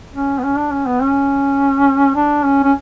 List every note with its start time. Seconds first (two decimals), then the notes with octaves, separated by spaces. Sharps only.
0.15 C#4
0.38 B3
0.43 C#4
0.58 D4
0.72 C#4
0.86 B3
1.01 C#4
2.15 D4
2.44 C#4
2.63 C#4